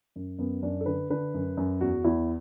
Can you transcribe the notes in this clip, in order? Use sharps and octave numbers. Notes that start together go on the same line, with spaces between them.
F#2
F#2 B3
F#2 D4
A4
D3 B4
D3 B4
F#2
F#2
E2 F#4
E2 E4